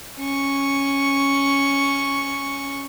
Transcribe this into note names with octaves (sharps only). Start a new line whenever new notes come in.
C#4 C#6